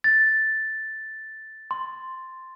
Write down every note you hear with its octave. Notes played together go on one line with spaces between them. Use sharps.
A6
C6